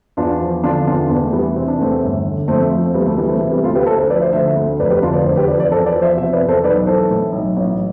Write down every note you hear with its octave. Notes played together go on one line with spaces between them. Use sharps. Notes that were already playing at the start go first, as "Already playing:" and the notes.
E2 D4 F4
F3
D3 D4 F4
E2 D4 F4
E2 B3 D4
A3
E3 G3 B3
C3 C4
D4
E2 A3 C4
G1
D3
F2 A3 C4
F3
C4
D2 G3 B3
A3
E3 G3
A3 C4
C3
G3 B3
D2 F4 A4
G4 B4
D2 A4 C5
A4 C5
F3 B4 D5
C5 E5
D3 C5 E5
D2
F1 B4 D5
G4 B4
D3 D4 F4
B4 D5
E2 A4 C5
G4 B4
F3 B4 D5
B4 D5
E2 A4 C5
B4 D5
F3
C5 E5
C3 C5 E5
B4 D5
E2
A4 C5
B1 B4 D5
E3 A4 C5
A2
B1
A1